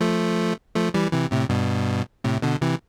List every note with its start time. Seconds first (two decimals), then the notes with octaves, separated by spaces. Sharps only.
0.01 F3 A3
0.75 F3 A3
0.94 E3 G3
1.13 C3 E3
1.32 A2 C3
1.49 G2 B2
2.24 A2 C3
2.42 B2 D3
2.61 C3 E3